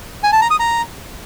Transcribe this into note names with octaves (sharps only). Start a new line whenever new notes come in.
G#5
A5
A#5
D#6
A#5